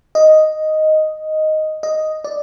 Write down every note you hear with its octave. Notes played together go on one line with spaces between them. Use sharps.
D#5
D#5
D5